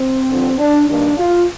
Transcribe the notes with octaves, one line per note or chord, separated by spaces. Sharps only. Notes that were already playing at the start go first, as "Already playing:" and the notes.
Already playing: C4
G2 D3 F3
D4
G2 D#3 A#3 D4
F4